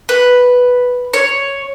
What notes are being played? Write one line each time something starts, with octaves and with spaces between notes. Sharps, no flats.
B4
C#5